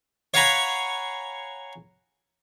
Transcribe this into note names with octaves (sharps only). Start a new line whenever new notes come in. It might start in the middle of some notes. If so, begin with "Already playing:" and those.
C#5 F5 F#5 G#5 A#5 B5